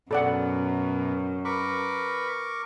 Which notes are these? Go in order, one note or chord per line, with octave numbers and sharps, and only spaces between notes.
F#2 B2 A4 D5 F#5
A#4 B4 C#6 D6